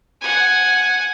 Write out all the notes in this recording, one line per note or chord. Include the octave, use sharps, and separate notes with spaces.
F#5 G#5